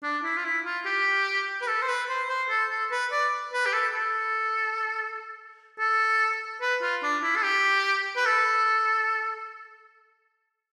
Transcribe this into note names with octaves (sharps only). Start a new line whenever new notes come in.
D4
E4
F4
E4
F4
G4
B4
A4
C5
B4
C5
C5
A4
A4
B4
D5
B4
G4
A4
A4
A4
B4
F4
D4
E4
A4
G4
B4
A4